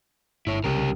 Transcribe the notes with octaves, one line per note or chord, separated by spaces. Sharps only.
G1 E4 C#5
C2 C#3 G4 A#4